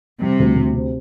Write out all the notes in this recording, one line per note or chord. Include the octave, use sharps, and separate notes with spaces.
C3 G3
D2
D2
C3